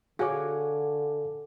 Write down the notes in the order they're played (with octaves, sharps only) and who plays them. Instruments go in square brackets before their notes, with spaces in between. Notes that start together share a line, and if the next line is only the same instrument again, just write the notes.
[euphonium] D3 [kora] F#4 [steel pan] G#4 C#5 [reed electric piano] F5 G#5 D6